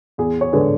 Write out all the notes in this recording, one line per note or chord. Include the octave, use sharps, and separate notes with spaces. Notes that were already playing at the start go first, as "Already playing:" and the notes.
E2 G#4
C#5
D3 G#3 G#4 B4